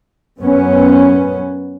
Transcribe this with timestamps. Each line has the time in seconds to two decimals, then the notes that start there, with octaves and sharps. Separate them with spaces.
0.41 F#2 B3 C#4